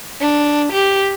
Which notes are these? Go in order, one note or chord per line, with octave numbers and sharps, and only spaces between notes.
D4
G4